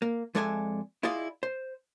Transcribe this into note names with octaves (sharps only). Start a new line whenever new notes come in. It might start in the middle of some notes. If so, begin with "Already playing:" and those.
A#3
F2 G#3 A4 D5 E5 G#5
E4 F4 G#4 D5 D#5 F5
C5